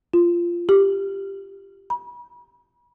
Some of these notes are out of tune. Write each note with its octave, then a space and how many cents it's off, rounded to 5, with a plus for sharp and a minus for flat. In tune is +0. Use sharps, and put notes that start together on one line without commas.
F4 -15
G4 +5
B5 -35